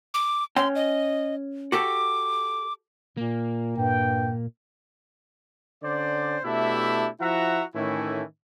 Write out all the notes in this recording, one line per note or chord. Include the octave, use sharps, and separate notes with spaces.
D6
C#4 G5 C6
D#5
F#4 G4 A4 D6
A#2 A#3
G2 A#2 G5
D3 C#4 C5 D5
B2 A3 D4 E4 G4 E5
F3 E4 F#4 E5 F#5 A#5
A2 D#3 E3 A3 C#4 E4